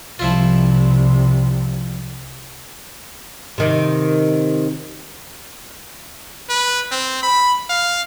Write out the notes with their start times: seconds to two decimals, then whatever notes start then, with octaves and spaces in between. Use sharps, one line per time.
0.19 C2 C3 F3 E4 F4
3.58 C3 D#3
6.49 B4
6.92 C4
7.23 B5
7.70 F5